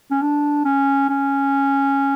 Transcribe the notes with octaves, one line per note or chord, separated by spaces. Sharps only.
C#4
D4
C#4
C#4